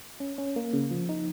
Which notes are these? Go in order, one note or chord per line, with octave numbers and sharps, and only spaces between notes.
C#4
C#4
A#3
C#3
F3
D#4